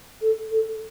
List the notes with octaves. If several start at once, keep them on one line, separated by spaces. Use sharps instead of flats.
A4
A4